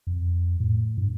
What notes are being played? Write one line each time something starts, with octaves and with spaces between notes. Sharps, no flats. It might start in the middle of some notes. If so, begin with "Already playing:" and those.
F2
A2
G2